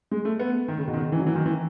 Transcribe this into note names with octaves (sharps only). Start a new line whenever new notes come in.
G#3
A3
B3
D#3
C#3
B2
D#3
C#3
E3
F#3
E3
D#3
E3